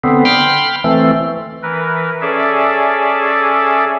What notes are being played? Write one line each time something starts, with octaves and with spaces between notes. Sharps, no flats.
D3 B3 C4
G5 B5 C6 F6
E3 A3 C4
E3 A#4 B4
C#4 G#4 A4 D5 E5